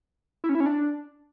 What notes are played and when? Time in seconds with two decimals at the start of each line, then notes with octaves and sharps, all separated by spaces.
0.44 E4
0.49 C#4
0.55 E4
0.60 C#4
0.66 D4